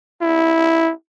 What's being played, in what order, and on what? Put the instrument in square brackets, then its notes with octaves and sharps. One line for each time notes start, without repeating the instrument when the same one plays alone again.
[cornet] E4